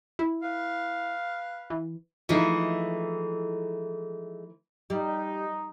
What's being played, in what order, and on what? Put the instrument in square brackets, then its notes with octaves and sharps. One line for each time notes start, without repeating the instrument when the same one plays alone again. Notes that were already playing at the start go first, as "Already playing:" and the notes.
[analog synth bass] E4
[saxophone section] B4 F5
[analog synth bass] E3
[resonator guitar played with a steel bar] E3 F3 D#4 [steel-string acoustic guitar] G#3 A3
[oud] G3 [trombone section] D#4